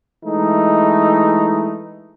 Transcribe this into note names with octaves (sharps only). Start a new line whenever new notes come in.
E3 G#3 A3 D#4